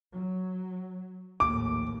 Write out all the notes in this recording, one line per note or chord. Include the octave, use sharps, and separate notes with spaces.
F#3
A#1 D#2 A2 D6